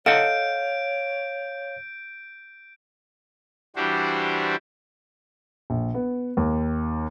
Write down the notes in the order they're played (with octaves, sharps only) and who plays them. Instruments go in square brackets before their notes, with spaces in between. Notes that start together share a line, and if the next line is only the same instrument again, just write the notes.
[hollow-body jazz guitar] A4 D#5 F#5 [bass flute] C#5 [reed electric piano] F5 [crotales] G6 D7
[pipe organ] E3 G3 D4 F#4 G4 C5
[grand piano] A#1
B3
D#2